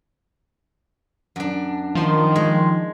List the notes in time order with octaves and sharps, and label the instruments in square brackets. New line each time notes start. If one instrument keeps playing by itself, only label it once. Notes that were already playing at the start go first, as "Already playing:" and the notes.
[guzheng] F#2 D4
[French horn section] D#3 [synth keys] F3 C6
[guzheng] G#3